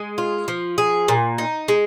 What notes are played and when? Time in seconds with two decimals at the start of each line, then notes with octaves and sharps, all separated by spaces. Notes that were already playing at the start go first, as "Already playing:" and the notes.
Already playing: G#3
0.18 F4
0.48 F3
0.78 G#4
1.08 A#2
1.38 D#4
1.68 G#3